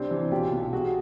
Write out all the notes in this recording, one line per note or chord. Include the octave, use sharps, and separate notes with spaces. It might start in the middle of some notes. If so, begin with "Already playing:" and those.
Already playing: C2 C4 D4
C3 E3
B1 F4 G4
B2
C2 F#4 G#4